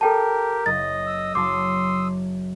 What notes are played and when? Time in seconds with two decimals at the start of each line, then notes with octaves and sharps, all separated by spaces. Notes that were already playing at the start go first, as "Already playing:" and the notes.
0.01 G4 A4 A#4 G5 A5
0.66 F#1 D#5 A6
1.07 D#6 E6
1.35 F#1 F#3 A5 C6 D6